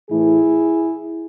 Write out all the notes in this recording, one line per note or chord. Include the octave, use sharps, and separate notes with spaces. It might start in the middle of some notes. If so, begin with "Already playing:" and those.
A2 E3 A3 E4 G#4